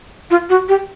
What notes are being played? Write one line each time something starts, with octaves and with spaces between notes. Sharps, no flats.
F4
F#4
G4